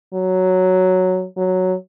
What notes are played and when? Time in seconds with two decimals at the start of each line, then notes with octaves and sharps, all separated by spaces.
0.14 F#3
1.37 F#3